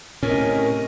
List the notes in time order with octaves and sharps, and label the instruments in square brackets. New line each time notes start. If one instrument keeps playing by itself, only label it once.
[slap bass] A2 [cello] C3 D#5 [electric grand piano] C#4 [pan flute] A#4